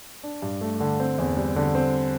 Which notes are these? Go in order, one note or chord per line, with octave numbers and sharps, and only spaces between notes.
D4
G2
A3
D3
C4
E2
G3
D3
C4